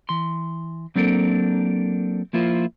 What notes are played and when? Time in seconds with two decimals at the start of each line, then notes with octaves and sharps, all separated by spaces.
0.09 E3 C6
0.96 F#3 A#3 C4 D4 A4 A#4
2.33 F3 A#3 E4 F4 C5